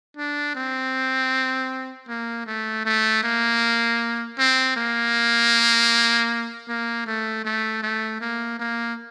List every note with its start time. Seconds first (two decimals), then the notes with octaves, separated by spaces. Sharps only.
0.17 D4
0.55 C4
2.08 A#3
2.47 A3
2.85 A3
3.23 A#3
4.38 C4
4.76 A#3
6.68 A#3
7.06 A3
7.44 A3
7.83 A3
8.21 A#3
8.59 A#3